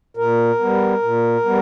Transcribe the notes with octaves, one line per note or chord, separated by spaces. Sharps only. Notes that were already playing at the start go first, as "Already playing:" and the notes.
A#2 A#4
G3 B3
A#2
G3 B3